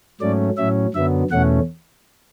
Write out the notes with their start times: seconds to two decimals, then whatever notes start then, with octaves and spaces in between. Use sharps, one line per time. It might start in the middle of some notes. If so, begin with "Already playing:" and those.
0.21 G#2 F#3 A3 C#4 D5
0.57 A2 F#3 C#4 E5
0.94 F#2 D3 F#3 B3 E5
1.31 E2 B2 A3 C#4 F#5